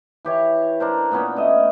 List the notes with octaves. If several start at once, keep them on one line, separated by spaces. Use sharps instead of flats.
E3 G4 C#5
D4 A#4 C5
A#2 B3 C#4 D4
A3 D#5